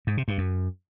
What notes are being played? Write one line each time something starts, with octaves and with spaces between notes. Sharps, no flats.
G#2
C3
G2
F#2